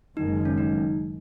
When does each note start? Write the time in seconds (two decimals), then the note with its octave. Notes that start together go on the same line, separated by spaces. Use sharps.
0.17 F#1 F#2 D#3 G#3 D#4
0.45 C#4
0.58 D#4